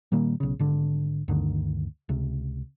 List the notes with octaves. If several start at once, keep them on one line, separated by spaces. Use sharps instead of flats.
A#2 D#3 G3 A#3
B1 C#3
G#1 D3
D2 G2 D3 D#3
C#2 C3